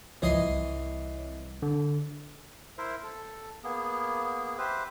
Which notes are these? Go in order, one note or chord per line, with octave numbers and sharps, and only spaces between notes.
G#1 C#2 E3 F3 C#5 D#5 C6
C2
D3
E4 A#4 C5 E5
A4
A#3 B3 G#4
G4 B4 C5 E5